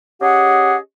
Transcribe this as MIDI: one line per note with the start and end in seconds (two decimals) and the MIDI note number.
0.21 0.76 61
0.21 0.76 67
0.21 0.76 68
0.21 0.76 75
0.21 0.76 78